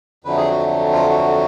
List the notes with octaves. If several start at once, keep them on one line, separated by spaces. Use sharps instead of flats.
F2 D3 F#3 A3 B4
G#4
F#4
F4
F#4